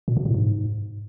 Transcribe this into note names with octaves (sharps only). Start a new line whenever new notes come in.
A#2
B2
A2
G#2